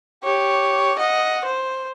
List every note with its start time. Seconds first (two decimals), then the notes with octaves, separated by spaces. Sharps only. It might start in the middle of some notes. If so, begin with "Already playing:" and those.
0.24 G4 C#5
0.98 D#5 F#5
1.45 C5